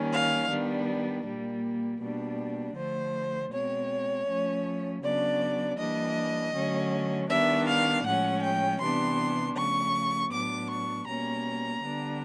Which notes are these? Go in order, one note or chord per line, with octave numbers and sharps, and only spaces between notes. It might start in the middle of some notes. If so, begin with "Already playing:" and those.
Already playing: D#3 G3 A#3 C#4
F5
D#3 G3 B3 D4
A#2 G3 A#3
B2 G3 A#3 D4
D3 F3 A3 C5
B2 G#3 C4 C#5
F3 A3 C#4
C#3 F#3 B3 D4 D5
E3 G3 A#3 D4 D#5
D3 F#3 A3 C#4
D#3 G3 B3 D4 E5
F5
A2 F3 G#3 C#4 F#5
G5
C3 E3 G3 B3 D4 C6
C#3 F3 A3 C#6
A2 F#3 B3 D4 D6
C#6
B2 G3 A#3 C#4 A#5
D3 G3 B3 D4